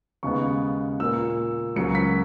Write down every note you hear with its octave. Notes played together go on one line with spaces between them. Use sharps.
D#2 C#3 G#3 B3 C#6
A#2 A#3 E6
C#2 C#3 F#3 A#3 C#7
B6